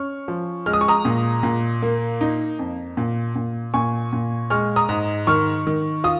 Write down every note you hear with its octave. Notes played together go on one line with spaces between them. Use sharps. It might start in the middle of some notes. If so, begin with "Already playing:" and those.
Already playing: C#4 C#6 F6
F3
G#3 F6
D#6
C#6
A#5 D#6
A#2
A#2
A#3
D#4
F2
A#2
A#2
A#2 G#5 C#6
A#2
G#3 C#6 F6
A#5 D#6
G#2
D#3 C#6 F6
D#3
F4 D#6